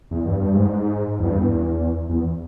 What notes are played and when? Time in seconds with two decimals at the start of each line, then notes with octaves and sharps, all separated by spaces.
0.11 E2
0.26 G2
0.39 G2
0.54 G#2
1.19 E2
1.25 G2
1.38 E2
2.09 E2